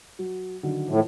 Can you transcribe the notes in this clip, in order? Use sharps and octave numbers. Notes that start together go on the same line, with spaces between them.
F#3
D3 D#3 F#3
A2 E3 F3